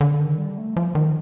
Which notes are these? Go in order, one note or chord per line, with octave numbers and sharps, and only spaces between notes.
D3
D#3
G3
A3
F3
D#3